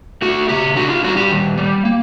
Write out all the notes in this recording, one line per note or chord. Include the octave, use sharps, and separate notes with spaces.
A3 F#4
C#3 G4
D4 F#4
F4
G3 F#4
G4
D#3
G3
A#3